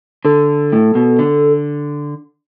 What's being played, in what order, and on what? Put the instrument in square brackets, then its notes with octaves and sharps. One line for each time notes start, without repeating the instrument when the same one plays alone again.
[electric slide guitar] D3 [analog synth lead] A4
[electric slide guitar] A2
B2
D3